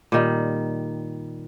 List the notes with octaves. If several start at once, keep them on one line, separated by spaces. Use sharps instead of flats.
A#2 D#3 G3